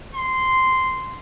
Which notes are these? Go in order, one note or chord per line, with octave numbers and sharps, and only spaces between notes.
C6